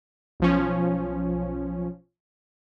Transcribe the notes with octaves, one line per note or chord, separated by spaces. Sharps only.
B1 F3 C#4